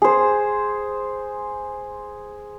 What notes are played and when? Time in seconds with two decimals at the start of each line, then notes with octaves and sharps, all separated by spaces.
0.02 G#4 C5